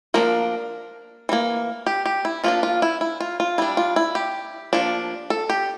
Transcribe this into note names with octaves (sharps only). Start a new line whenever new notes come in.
F3 A#3 D4 A#4
E3 G3 A#3
G4
G4
E4
F3 A#3 D4 F4
F4
E4
E4
F4
F4
G3 D4 E4
F4
E4
G4
F3 A#3 D4
A4
G4